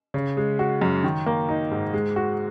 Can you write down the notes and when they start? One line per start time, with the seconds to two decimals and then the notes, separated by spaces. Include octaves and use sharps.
0.14 C#3
0.37 G#3
0.59 F#4
0.82 F#2
1.04 D#3
1.26 A#3
1.49 D#4
1.71 G#2
1.94 G#3
2.16 F#4